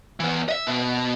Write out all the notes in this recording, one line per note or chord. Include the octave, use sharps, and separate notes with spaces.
E3 B3
D#5 E5
B2